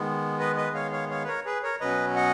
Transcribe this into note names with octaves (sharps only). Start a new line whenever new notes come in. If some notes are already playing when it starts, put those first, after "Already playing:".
Already playing: D#3 G#3 B3
B4 D#5
B4 D#5
C#5 F5
C#5 F5
C#5 F5
B4
A#4 C#5
G#4 B4
A#4 C#5
B2 F#3 C#4 B4 D#5
D#5 F#5